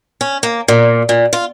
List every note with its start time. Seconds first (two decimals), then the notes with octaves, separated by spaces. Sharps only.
0.21 C#4
0.43 A#3
0.68 A#2
1.09 A#2
1.33 F4